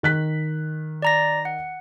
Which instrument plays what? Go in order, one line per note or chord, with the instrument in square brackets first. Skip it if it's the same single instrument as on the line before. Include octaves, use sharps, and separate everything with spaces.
[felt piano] D#3 F#6 B6
[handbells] D5 A#5 A#6
F#5